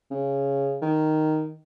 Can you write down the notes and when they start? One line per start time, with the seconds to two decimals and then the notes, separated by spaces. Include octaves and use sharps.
0.11 C#3
0.82 D#3